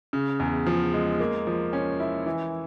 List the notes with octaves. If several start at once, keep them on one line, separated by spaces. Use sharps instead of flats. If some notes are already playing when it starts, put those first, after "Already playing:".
C#3
E2
F3
G#3
A#3
F3
C#4
E4
E3